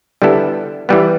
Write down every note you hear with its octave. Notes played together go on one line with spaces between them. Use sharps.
D3 G3 B3 E4 A4
E3 G3 B3